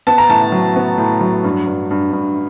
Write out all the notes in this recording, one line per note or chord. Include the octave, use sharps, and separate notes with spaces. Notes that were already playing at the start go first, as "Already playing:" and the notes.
B3 A5
A#5
A2 A5
F#3
B3
A2
F#3
G2
G2
G2
G2